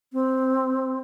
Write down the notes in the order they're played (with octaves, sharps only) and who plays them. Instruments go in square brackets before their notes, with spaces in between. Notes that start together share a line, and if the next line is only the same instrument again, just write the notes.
[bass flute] C4